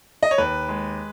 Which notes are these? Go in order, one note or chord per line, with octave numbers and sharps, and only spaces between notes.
D#5
C#5
D#2 B4
G#3